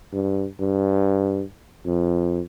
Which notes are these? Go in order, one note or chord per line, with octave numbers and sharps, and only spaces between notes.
G2
G2
F2